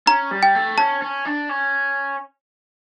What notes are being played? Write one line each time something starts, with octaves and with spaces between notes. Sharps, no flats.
C#4 A#5
G3
G5
A3
C#4 A5
C#4
D4
C#4